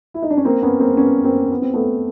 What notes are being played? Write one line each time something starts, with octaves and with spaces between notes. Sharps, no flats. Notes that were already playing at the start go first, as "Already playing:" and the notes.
E4
D#4
D4
C#4
A#3 C4
B3 C#4
A#3 C4
B3 C#4
A#3 C4
B3
C4
A3 B3